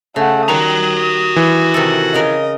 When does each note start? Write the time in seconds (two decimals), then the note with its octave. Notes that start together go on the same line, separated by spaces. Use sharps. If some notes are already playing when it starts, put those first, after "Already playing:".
0.16 C#3 A3 F#5
0.48 D#3 G3 F#4 A#5 D#6
1.36 E3
1.74 C3 D#3 A4
2.14 C#3 A#4 D#5